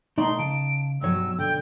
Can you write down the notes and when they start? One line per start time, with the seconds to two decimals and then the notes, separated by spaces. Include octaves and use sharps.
0.18 B2 A3 D#4 D5 C6
0.39 C#3 A5 D7
1.01 B1 G2 B2 F#3 C#5 E6
1.38 D3 G5